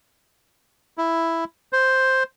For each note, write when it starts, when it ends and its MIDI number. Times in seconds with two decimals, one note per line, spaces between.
0.98 1.44 64
1.73 2.23 72